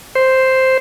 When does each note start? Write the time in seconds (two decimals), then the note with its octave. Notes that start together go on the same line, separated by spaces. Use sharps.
0.15 C5